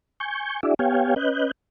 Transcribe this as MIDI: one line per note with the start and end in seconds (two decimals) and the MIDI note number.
0.20 0.60 80
0.20 0.60 85
0.20 0.60 91
0.63 0.74 62
0.63 0.74 64
0.63 0.74 66
0.63 0.74 68
0.63 0.74 74
0.63 0.74 76
0.79 1.14 59
0.79 1.14 67
0.79 1.14 73
0.79 1.14 77
0.79 1.14 79
0.79 1.14 80
1.16 1.51 61
1.16 1.51 71
1.16 1.51 75
1.16 1.51 90
1.16 1.51 91